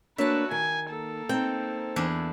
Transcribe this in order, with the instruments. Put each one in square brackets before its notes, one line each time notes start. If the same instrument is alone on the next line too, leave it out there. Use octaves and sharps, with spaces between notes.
[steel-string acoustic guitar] A#3 D4 C#5 [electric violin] F#4 B4 [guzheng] E5 A5
[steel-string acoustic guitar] D#3 [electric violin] G#5
[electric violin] A#3 A4
[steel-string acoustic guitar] C4 D#4 [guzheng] G5
[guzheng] E2 D4 E4